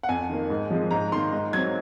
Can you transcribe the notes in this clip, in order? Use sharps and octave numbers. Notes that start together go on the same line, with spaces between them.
F#5
F2 G#5
D#3 A#3
G#2
F3 G#3 C4
G#2 A#5
D#3 A#3 C6
G#2
F#3 C4 G#6